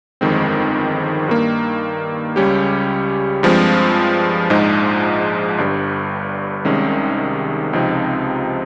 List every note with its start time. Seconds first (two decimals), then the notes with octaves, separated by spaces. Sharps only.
0.21 G1 F2 D#3 G#3 C4
1.28 G2 D#3 A#3
2.36 C#2 C#3 G3 C#4 G4
3.43 G2 F3 G#3 C4
4.50 A#1 G#2 F3 G#3 D#4
5.58 G1 G2 G3
6.65 C2 C3 D#3 G#3 C#4
7.73 C#2 C3 F3 C4 D#4